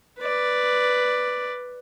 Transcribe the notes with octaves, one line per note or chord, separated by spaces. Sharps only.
B4 D5